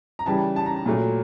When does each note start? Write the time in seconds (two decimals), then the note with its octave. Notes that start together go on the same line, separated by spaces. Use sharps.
0.19 A#5
0.26 C#3 E3 G3 A5
0.56 A5
0.66 A#5
0.76 A#5
0.86 A#2 F#3 A3